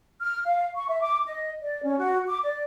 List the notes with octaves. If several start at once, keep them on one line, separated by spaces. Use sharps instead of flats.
F6
F5
C#6
E5
D6
D#5
D5
C#4
F#4
D6
D5